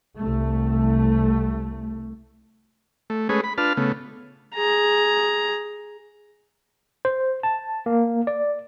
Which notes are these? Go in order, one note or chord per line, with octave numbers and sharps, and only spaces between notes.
C2 A3
A3
G#3 A3 C#4 G#4 B4
B5
D4 F4 B4 A5 F6
C#3 A3 B3
G#4 A#5
C5
A5
A#3
D5